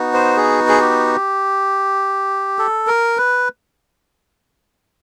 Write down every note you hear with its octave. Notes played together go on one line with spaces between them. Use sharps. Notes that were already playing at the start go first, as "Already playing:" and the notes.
Already playing: B3 D#4 F#4
C5
G#4
G#4
G4
A4
A#4
B4